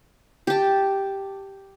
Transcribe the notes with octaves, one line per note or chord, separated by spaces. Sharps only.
G4 A5